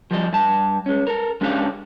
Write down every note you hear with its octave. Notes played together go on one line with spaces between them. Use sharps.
F3 G3 D#5
G2 A5
G#3 C#4
A4 A#4
G#3 C#4 D4 G4 A4 F5